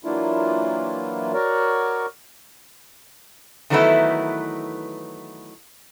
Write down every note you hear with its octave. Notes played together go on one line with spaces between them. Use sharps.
E3 F#3 A#3 D4 E4 F4
F#4 A#4 C#5 D5
D#3 E3 F#3 A3 B3 E4